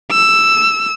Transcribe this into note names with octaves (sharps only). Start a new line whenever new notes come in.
E6